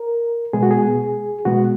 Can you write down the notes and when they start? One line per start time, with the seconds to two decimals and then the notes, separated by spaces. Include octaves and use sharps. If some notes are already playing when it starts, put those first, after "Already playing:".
Already playing: A#4
0.53 B2 G#3 B3 G#4
0.63 F#4
0.71 G#4
1.45 B2 G#3 B3 F#4